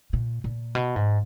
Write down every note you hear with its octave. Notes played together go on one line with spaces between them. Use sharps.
A#2
A#2
B2
G#2